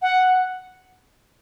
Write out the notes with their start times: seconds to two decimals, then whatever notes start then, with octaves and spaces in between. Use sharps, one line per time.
0.02 F#5